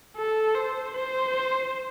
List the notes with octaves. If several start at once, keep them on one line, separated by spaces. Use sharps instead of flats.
A4
C5
C5